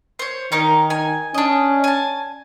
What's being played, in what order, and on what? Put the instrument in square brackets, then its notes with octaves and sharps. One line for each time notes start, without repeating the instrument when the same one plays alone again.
[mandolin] C5 C#5
[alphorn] D#3 [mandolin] C#4 D#4 A#4
[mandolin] G#5
[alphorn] C#4 [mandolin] D4 D#5
[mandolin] G#5 A5